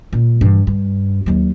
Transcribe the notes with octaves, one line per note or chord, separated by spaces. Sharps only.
A#2
G2 E3
G2
D#2 F#3